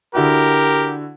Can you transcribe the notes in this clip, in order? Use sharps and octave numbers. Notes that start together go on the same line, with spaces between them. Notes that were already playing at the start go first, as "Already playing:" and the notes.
D3 E4 F#4 G4 A#4